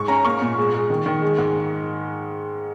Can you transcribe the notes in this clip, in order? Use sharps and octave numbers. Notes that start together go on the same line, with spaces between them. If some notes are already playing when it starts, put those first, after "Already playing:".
Already playing: G#2 C#6
C#4 A#5
A#3 C#6
A#2
G#3
G#3
D#3
D#3
G#3
G#2